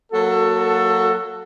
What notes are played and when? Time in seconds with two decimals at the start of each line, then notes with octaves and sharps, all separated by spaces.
0.12 F#3 A#3 F#4 A4